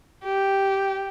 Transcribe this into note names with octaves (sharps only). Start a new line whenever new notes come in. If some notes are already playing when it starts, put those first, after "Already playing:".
G4